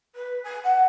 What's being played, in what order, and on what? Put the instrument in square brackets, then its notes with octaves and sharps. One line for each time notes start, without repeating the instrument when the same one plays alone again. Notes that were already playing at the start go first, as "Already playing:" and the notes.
[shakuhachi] B4
G#5
F#5